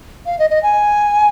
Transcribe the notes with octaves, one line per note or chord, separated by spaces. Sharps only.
F5
D#5
D#5
G#5